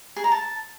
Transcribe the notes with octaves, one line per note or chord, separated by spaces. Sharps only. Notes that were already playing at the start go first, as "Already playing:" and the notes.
G#4
A#5
A5